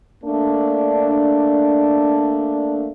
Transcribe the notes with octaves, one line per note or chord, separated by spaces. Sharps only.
A3 A#3 D4